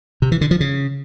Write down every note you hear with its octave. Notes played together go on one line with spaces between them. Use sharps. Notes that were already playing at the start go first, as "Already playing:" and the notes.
C3
E3
D3
F3
C#3